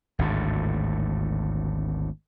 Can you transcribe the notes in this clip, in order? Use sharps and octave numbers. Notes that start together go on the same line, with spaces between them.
G#1 D2 A2